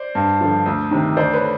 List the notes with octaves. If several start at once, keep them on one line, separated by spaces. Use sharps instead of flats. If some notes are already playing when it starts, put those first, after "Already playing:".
Already playing: C5 D5
G2
D3 F3
D2
C3 D#3
D2 C5 D5
B4 C#5
D3